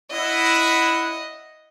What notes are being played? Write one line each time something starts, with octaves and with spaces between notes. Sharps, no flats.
E4 D#5 F#5